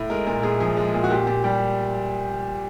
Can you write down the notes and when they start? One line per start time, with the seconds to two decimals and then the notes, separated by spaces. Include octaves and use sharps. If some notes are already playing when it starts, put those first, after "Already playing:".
Already playing: A2
0.10 G#3 A#4
0.27 A#2 A#4
0.43 A#2 G#4
0.60 F3 G#4
0.77 G#3
0.94 A#2
1.04 F#4
1.10 A#2 G4
1.27 A#2 G4
1.44 G3 G4